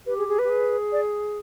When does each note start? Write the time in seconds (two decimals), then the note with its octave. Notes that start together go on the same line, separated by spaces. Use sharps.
0.06 G4 B4
0.18 G#4
0.28 G#4
0.39 B4
0.44 G4
0.49 G#4
0.92 D5